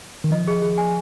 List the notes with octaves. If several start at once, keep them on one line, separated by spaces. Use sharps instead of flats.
D#3
F3 D#5
G#4
G#4
G#5